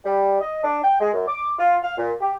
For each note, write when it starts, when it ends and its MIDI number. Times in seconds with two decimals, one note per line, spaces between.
0.05 0.39 55
0.41 0.63 75
0.63 0.79 62
0.84 0.95 79
1.00 1.10 56
1.14 1.27 42
1.27 1.52 86
1.58 1.75 65
1.82 1.95 77
1.97 2.13 46
2.20 2.34 67